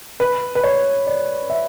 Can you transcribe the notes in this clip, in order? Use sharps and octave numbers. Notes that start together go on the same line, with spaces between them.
B4
B4
C#5
D5
E5